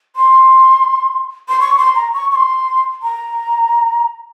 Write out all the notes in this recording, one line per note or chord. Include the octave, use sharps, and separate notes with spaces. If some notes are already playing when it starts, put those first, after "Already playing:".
C6
C6
C#6
C6
A#5
C#6
C#6
C6
A#5